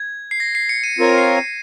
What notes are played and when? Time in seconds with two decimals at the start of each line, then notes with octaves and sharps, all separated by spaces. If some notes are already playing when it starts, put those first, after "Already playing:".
Already playing: G#6
0.31 C7
0.40 A#6
0.55 C7
0.69 C#7
0.84 D#7
0.99 C4 F4 A#4 C#5
1.18 C7
1.37 D#7